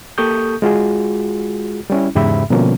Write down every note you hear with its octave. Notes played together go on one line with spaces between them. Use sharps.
A#3 G4 A4 C#6 D#6 G6
G#3 F4 F#4 G#4
G3 C#4 E4
E2 G#2 C#3 G4 E5 B5
B2 D3 F3 G3 A#3 C#4